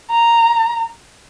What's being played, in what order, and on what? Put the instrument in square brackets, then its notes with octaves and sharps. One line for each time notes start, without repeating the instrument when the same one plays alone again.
[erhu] A#5